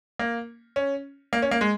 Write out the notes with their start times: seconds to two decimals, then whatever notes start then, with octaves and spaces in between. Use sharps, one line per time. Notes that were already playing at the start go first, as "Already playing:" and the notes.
0.19 A#3
0.76 C#4
1.33 A#3
1.42 C#4
1.51 A#3
1.61 G#3